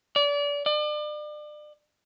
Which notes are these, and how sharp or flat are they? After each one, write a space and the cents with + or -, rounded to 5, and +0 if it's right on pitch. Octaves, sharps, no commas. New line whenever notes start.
D5 -30
D5 +35